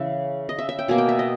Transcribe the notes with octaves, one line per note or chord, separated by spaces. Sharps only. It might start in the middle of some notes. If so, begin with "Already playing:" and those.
Already playing: C#3 E3 E5
D#5
E5
E5
G5
B2 A#3 G#5
G5
E5
D#5